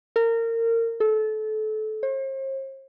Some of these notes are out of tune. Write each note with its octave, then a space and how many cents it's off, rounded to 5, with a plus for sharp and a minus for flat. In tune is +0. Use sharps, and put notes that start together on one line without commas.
A#4 -25
A4 -25
C5 +45